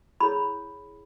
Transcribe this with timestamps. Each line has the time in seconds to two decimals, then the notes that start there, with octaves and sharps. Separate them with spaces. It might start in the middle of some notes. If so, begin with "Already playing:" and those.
0.20 E4 G#4 C#5 B5